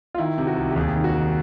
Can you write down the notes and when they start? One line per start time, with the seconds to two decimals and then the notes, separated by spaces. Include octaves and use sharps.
0.14 F4
0.18 D#3 E4
0.38 C3
0.47 F#4
0.56 C2
0.71 G4
0.76 D#2 G#4
0.95 D#3
1.04 F#4
1.14 D#3